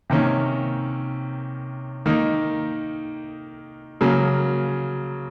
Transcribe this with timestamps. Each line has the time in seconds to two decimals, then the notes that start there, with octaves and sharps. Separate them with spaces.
0.10 C3 D#3 A#3 C#4
2.06 D#3 A#3 D#4
4.01 C#3 F#3 A#3